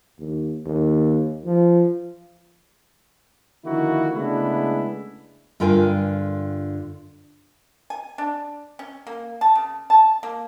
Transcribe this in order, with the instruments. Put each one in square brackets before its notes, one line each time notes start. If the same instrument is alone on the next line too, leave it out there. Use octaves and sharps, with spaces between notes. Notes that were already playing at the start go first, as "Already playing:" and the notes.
[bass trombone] D#2
D#2
F3
[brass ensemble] D3 D#3 F3 A#3 E4 F#4
C#3 G#3 A3 B3 D4 E4
[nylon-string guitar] G2 D3 F4 A#4 G5 G#5
[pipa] G#5
D4
C#4
A#3
A5
C#3
A5
A#3